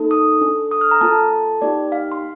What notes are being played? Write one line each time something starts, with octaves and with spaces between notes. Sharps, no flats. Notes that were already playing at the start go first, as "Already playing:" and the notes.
Already playing: A#3 D#4 A4
D#6
D4 A4
D#6
F6
A#5
A#3 F4 A4 A5
A#3 D#4 G4 D5
F5
C6